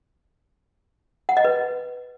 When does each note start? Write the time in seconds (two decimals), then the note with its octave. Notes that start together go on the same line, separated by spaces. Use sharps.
1.29 F#5
1.37 D#5
1.45 B4